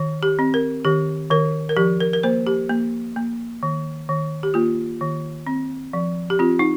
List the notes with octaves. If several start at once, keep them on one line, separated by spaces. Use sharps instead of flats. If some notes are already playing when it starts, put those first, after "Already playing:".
Already playing: D#3
G4
C4
A#4
D#3 G4
D#3 A#4
A#4
F3 G4
A#4
A#4
A#3 C5
G4
A#3
A#3
D#3
D#3
G4
A#3 F4
D#3
C4
F3
G4
C4 F4
D#4